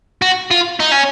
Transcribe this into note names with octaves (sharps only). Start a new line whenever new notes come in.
F#4
F4
D#4
C#4